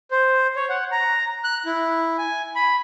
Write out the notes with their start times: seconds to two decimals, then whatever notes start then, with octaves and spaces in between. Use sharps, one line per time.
0.11 C5
0.56 C#5
0.69 F#5
0.92 A#5
1.44 F#6
1.66 E4
2.18 G#5
2.55 B5